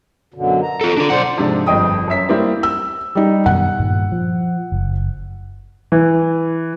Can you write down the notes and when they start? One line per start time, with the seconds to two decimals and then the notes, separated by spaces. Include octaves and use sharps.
0.34 F#2 B2 D3
0.63 A#5
0.81 F4 A4
0.97 D4 A4
1.10 B1 C5 D5 F#5
1.37 G#2 C3 F3 G#3 D4
1.67 G1 F2 D#5 G5 D#6
2.07 F#2 C#4 E5 B6
2.29 G3 A#3 C4 E4
2.63 E6
3.15 G3 D#4
3.46 F#2 B2 D#3 F#5
3.79 G2 A#2 D#3
4.12 F3
4.72 F#1
5.92 E3